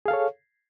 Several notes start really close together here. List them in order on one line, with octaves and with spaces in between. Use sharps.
G#4 F5 A4 C#5